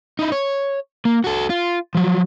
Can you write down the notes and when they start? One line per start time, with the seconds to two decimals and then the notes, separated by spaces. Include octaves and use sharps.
0.19 D#4 E4
0.32 C#5
1.05 A#3
1.24 F#4 A4
1.50 F4
1.95 F3 F#3